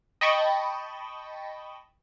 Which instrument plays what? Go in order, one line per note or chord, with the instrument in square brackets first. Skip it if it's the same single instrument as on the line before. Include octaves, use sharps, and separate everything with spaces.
[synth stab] D#5 G5 A5 B5 C#6